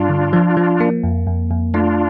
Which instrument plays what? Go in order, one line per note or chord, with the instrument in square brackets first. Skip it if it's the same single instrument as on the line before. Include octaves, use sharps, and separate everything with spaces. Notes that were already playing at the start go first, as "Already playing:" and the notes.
Already playing: [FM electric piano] G2 [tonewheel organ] D4 F4
[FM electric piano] D3
F3
F3
A#3
F2
F2
F2
[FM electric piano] A3 [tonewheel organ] D4 F4